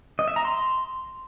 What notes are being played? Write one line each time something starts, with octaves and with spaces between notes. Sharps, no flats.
D#5
E5
A#5
C6